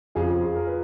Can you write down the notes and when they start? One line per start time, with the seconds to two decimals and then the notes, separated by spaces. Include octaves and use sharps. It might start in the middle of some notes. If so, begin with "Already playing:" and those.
0.15 F2 C#3 F3 F4 G#4
0.56 A#4
0.67 B4